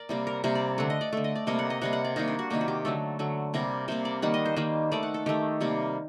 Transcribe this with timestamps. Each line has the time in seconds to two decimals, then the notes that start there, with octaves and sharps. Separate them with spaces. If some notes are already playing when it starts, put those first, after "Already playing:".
Already playing: A#4 D5
0.09 C3 G3 A#3
0.27 A#4
0.44 C3 G3 A#3 C5
0.55 D5
0.78 D3 A3 F#5
0.90 D#5
1.01 D5
1.13 D3 A3
1.24 D#5
1.35 D5
1.47 C3 G3 A#3 D#5
1.59 F#5
1.70 D#5
1.82 C3 G3 A#3 F#5
1.93 F#5
2.04 D5
2.16 C3 D#3 G3 A#3 D#4
2.28 D4
2.39 F#4
2.50 C3 D#3 G3 A#3 G4
2.61 F#4
2.68 G4
2.85 D3 F#3 A3 A4
3.19 D3 F#3 A3
3.54 C3 G3 A#3 A#4
3.88 C3 G3 A#3 C5
4.05 D5
4.22 D#3 G3 A#3 F#5
4.34 D#5
4.45 C5
4.56 D#3 G3 A#3
4.92 D#3 A3 D5
5.03 F#5
5.14 A4
5.26 D#3 A3 G4
5.61 C3 G3 A#3